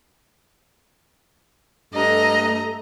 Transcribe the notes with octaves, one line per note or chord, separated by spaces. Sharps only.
G2 A3 D#5 A#5